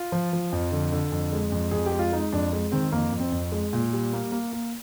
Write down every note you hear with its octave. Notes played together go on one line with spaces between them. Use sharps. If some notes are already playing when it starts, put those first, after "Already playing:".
Already playing: F4
F3
F3
F2
D3
D3
F2
G#3
F2
F2 G#4
G4
G#3
F4
G#3 D#4
F2 D4
G#3
D#3 C4
F2 A#3
F2
C4
F2
G#3
A#2
G3
A#3
A#3
A#3